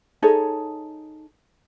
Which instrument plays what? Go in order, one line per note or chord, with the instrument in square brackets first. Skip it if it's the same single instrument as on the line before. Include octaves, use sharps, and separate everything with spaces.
[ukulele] D#4 G#4 A4 C#5